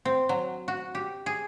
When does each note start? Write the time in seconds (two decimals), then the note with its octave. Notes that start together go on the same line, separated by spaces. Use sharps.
0.05 C4
0.29 F#3
0.68 F#4
0.95 G4
1.26 G#4